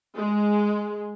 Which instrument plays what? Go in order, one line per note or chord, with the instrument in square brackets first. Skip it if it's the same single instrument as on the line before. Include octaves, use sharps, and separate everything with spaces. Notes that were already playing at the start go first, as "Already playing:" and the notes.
[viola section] G#3